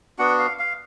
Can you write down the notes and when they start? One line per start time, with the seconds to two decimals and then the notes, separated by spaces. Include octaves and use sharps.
0.19 B3 D4 F#4 F#5
0.39 F5
0.59 F5